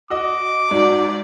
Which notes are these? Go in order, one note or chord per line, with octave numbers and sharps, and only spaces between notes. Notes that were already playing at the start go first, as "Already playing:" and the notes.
F#4 D#5 D6
G#2 F#4 D5